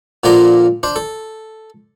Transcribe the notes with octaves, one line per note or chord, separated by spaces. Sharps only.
A#2 D3 F3 D5 A#5 C6
D4 C5
A4